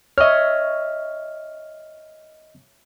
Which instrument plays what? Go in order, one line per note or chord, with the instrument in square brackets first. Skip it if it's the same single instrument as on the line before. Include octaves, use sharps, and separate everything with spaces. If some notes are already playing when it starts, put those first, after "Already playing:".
[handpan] C#5 E5 [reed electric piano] D#5 F6